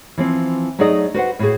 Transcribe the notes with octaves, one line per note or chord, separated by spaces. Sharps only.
E3 F3 C4
F#3 A3 D#4 G#4 D5 D#5
F#4 B4 C5 F#5
A2 F#4 G#4